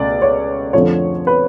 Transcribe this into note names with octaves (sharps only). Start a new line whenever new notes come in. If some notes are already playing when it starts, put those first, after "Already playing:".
Already playing: C#2 B2 A3 D5
C#5
F2 D3 F3 A3 C#5
B4